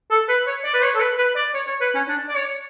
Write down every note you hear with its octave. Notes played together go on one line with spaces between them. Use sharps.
A4
B4
C#5
D5
B4
C#5
A4
B4
B4
D5
C#5
C#5
B4
C#4
D4
D5
C#5